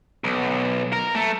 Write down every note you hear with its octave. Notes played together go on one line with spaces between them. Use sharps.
B1
A#4
A3